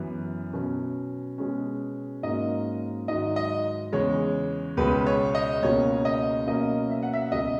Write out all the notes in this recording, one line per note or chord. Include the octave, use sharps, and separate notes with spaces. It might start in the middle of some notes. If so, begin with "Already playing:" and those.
Already playing: F#2 E3 B3
B2 F#3 C#4
B2 G#3 C#4
G#2 F#3 A#3 C#4 D#5
G#2 D#3 F#3 D#5
D#5
E2 C#3 G#3 C#5
C#2 B2 G#3 C#4 B4
C#5
D#5
C#2 B2 A#3 C#4 C#5
D#5
B2 F#3 A#3 C#4 D#5
E5
F#5
E5
C#2 B2 G#3 C#4 D#5